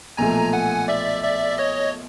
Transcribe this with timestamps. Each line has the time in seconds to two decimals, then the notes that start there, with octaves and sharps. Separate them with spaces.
0.17 B1 A#2 F3 A3 G#5 A#5
0.53 F#5 G#5
0.88 D5 E5
1.23 D5 E5
1.58 C#5 D#5